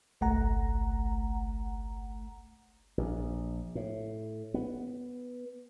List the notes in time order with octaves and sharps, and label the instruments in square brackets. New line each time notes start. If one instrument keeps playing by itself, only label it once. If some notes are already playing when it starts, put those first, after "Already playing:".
[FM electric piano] G1 C2 A3 F#5 A#5
[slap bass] A#1
A2
B3